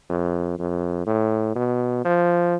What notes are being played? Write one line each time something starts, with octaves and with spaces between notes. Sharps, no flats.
F2
F2
A2
B2
F3